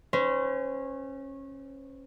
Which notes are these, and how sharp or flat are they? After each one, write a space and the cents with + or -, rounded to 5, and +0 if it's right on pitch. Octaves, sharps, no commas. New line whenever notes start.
C#4 -20 C5 -40